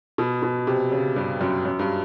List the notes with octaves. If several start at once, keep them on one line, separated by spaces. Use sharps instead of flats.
B2
B2
C3
C#3
G2
F#2
F#2
G2